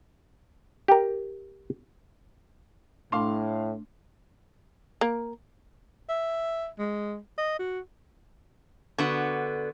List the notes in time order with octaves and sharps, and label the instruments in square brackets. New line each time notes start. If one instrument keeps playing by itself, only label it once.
[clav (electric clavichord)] G4 A#4
[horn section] A2 [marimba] A3 D4 [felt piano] F5 C6
[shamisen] A#3
[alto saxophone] E5
G#3
D#5
F#4
[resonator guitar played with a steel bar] D3 B3 F#4